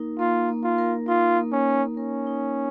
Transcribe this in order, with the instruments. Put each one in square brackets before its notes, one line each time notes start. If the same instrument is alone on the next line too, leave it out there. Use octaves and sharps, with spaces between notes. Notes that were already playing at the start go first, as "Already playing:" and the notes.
Already playing: [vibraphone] A#3 D#4 A#4
[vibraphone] A#3 [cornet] F4
[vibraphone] A#3
[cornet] F4
[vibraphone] A#4
[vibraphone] D#4 [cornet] F4
[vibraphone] A#3
[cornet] C#4
[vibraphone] A#3
[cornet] C#4 [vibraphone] A#4
[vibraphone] D#4